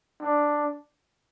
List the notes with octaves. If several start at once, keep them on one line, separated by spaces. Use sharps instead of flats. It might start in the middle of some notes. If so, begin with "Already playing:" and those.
D4